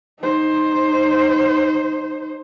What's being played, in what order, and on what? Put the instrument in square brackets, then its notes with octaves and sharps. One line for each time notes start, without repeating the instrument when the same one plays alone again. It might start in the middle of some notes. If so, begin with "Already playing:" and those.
[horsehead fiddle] D#4 C5